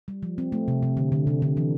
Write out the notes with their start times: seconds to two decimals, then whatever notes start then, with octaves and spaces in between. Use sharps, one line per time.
0.08 G3
0.23 F3
0.38 C4
0.52 A3
0.68 C3
0.83 C3
0.97 D3
1.12 D3
1.27 C3
1.42 D3
1.57 E3